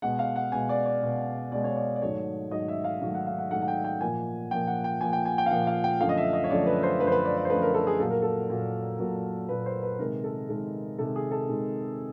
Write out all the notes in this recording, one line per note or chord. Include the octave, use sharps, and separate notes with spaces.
B2 G#3 F#5
F5
F#5
B2 G#3 G#5
D5
D5
B2 G#3
B2 G#3 D5
C#5
D5
D5
G#2 D#3 F#3 A3 C#5
G#2 D#3 F#3 A3 D#5
E5
F5
G#2 D#3 F#3 A3 F5
F#5
F5
F#5
G#2 D#3 F#3 A3 F#5
F#5
G5
G5
A#2 F3 A#3 G#5
A#2 F3 A#3 G5
F#5
G5
A#2 F3 A#3 G#5
G5
G#5
G5
F5
A#2 F3 A#3 F#5
F5
G5
F#2 D3 F3 A3 F5
D#5
E5
D#5
C#5
F#2 D3 F3 A3 D5
B4
C5
F#2 D3 F3 A3 B4
C5
B4
D5
D5
C5
F#2 D3 F3 A3 B4
A#4
A4
G#4
A#2 F#3 A#3 A4
A#4
A4
A#2 F#3 A#3
A#2 F#3 A#3
A#2 F#3 A#3 B4
C5
B4
C3 D#3 G#3 A#4
A4
C3 D#3 G#3 A4
C3 D#3 G#3 A4
G#4
A4
C3 D#3 G#3